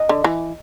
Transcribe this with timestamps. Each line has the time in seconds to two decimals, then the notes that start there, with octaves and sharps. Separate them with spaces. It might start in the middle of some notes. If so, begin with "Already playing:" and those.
Already playing: D#5
0.09 D3
0.24 E3